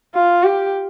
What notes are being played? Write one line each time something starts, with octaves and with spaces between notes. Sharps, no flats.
F4
G4